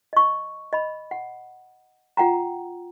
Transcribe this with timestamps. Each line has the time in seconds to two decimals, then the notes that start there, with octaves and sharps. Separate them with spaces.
0.13 D#5 C#6
0.73 D#5 B5
1.11 F#5
2.17 F4 F#5 G5 A#5